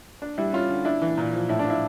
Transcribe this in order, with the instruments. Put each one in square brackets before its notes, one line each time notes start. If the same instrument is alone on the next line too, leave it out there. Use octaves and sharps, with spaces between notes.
[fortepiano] D4
[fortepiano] G3 [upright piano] E4
[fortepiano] C#4 [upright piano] F4
[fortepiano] D3
[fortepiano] D4 [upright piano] E4
[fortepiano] E3
A#2
F3
[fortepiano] A2 [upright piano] E4
[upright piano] D4
[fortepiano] F3 [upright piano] E4